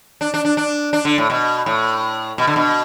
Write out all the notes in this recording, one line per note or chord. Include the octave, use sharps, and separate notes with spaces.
D4
D4
D4
D4
D4
D3
A2
B2
A2
B2
D3
B2